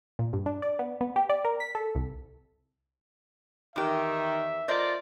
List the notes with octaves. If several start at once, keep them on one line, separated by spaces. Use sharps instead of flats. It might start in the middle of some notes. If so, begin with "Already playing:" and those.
A#2
G2
D4
D5
B3
B3
G4
D5
A#4
B6
A4
C2
E2 D#3 G4 E5
A3 F4 A#4 C5 D5 D#5